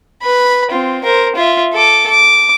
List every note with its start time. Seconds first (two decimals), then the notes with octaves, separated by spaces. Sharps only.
0.22 B4 B5
0.71 C4 F4
1.05 A#4 C5
1.36 F4 E5
1.73 A4 D6
2.10 D6